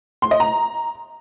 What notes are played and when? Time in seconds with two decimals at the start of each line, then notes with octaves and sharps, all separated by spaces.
0.22 C6
0.31 D#5
0.40 A#5